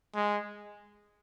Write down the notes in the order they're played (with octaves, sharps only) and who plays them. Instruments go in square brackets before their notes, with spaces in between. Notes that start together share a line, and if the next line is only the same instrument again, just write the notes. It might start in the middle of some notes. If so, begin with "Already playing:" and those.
[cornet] G#3